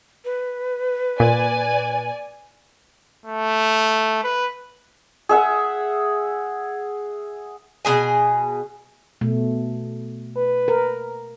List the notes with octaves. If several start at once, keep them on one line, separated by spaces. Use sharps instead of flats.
B4
A#2 D5 G#5
A3
B4
G#4 E5 F#5
B2 A#3 G#4 G#5
B2 A3
B4
A#4